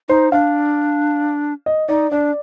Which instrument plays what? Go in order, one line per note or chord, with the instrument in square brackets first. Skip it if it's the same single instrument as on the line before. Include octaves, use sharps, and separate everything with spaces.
[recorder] D#4 [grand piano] C5
[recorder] D4 [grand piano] F5
[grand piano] D#5
[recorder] D#4 [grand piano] D5
[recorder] D4 [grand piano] D5